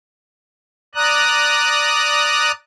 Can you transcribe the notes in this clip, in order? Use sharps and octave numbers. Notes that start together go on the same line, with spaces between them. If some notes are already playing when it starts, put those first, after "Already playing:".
D5 A#5 D#6 F#6